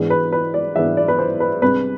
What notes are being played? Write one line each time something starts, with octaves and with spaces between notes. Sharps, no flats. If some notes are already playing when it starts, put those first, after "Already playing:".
Already playing: G#2 E3 G#3 B3 D4
B4
B4
D5
G#2 E3 G#3 B3 D4 E5
D5
B4
C5
B4
C2 C3 G#3 D4 B4